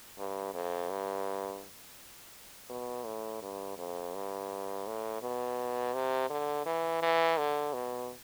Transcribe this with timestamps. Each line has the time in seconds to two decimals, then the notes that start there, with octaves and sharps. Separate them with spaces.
0.18 G2
0.54 F2
0.90 G2
2.70 B2
3.06 A2
3.42 G2
3.78 F2
4.14 G2
4.87 A2
5.22 B2
5.94 C3
6.30 D3
6.66 E3
7.02 E3
7.38 D3
7.73 B2